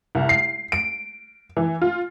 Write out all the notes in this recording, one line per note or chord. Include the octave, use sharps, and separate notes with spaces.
C2
C7
D7
E3
F4